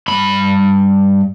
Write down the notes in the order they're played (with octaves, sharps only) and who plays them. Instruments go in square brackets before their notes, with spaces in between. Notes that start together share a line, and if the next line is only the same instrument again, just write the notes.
[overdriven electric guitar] G2 B5